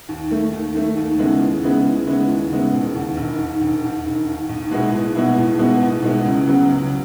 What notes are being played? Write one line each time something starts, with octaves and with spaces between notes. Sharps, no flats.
D#2
D#3 A3
D#2
D#3 A3
D#2
C#3 G#3 B3 E4
D#2
C#3 G#3 B3 E4
D#2
C#3 G#3 B3 E4
D#2
C#3 G#3 B3 E4
E1
D#2 D#3
E1
D#2 D#3
E1
D#2 D#3
E1
D#2 D#3
B1
B2 G#3 B3 E4
B1
B2 G#3 B3 E4
B1
B2 G#3 B3 E4
B1
B2 G#3 B3 E4
C#2
C#3 F#3 B3
C#2